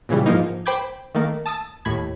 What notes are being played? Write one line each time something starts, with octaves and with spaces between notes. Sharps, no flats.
A#2 C#3 E3 G3
G#2 F3 A#3 D#4
C5 G5 B5 D6 G6 G#6
D#3 A3 A#3
A5 D#6 E6 A6
D#2 A2 B5 G#6